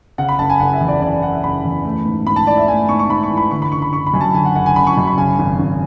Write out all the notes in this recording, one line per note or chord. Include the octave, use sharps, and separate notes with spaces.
C#3 F#5
B5
F#1 A5
G#5
F#1 F#5
E5
E2
D5
C#3 D5
F#1 F#5
E5
F#1 B5
E2
A3
G#2
G#2 B5
A5
E3 D5
E5
A3 G#5
G#2 C#6
C#6
G#2 B5
C#6
E3
B5
D3 C#6
B5
F#1 C#6
B5
F#1 C#6
B5
F#2 G#5
A5
D3 G#5
F#5
F#1 F#5
G#5
F#1 B5
C#6
F#2
B5
C#3 G#5
G#1
G#1